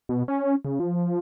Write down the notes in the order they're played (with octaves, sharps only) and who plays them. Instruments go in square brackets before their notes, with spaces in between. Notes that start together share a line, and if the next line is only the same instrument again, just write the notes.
[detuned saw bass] B2
C#4
C#3
F3